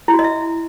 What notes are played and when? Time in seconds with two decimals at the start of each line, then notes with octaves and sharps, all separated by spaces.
0.08 E4
0.14 F#4
0.19 D#5
0.24 E5